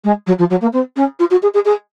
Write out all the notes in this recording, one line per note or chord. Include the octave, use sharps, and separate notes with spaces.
G#3
F#3
F3
F#3
A#3
C4
C#4
F4
F#4
G#4
G#4
G#4